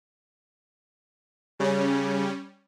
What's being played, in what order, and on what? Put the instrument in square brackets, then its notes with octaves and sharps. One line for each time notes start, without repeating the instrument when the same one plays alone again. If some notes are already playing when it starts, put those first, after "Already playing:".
[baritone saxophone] C#3 [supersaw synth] G3 C#4